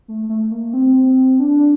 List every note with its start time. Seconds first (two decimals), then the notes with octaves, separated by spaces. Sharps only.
0.08 A3
0.29 A3
0.51 A#3
0.73 C4
1.40 D4